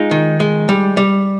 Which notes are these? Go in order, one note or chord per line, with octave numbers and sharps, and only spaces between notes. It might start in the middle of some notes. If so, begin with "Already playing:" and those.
Already playing: G#3 D#4 F4
D#3
G#3
G3
G3